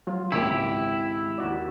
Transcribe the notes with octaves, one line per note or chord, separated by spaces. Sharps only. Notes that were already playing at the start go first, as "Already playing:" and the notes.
F#3 F4
G#1 C#2 A#2 C#3 E4 G4
D#2 F#4 D5